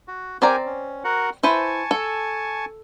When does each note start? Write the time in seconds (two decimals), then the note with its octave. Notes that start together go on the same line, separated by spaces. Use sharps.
0.08 F#4
0.42 C4 G4 A#4 D5 G#5 A#5
0.66 C#4
1.04 F#4 A#4 F#5
1.43 E4 B4 C5 G#5 A5 C#6
1.91 A4